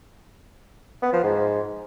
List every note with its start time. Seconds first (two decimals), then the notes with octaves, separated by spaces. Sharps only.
1.02 B3
1.13 F3
1.24 G#2